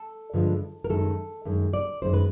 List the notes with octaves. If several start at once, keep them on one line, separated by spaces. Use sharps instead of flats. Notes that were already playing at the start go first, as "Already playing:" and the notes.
Already playing: A4
G2 D3 F3 G#3
A#4
F#2 D#3 G#3 A4
F#2 D#3 G#3
D5
F#2 D#3 G#3 C5
B4